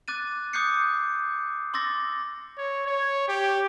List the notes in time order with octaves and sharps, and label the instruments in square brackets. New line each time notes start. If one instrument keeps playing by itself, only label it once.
[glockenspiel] D6 F#6 A6 D#7
D6 D#6 F#6 G6 C7 C#7
C6 D6 E6 A6 A#6
[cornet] C#5
C#5
G4